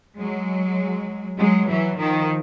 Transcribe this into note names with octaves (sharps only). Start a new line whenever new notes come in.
F#3 G#3
F#3 G#3
E3 F#3
D#3 F3